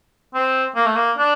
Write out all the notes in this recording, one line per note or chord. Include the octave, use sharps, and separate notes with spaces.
C4
A#3
A3
A#3
D4